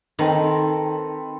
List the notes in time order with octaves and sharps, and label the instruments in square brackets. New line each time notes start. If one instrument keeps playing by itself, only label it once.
[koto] D#3 [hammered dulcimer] C4 A4 B4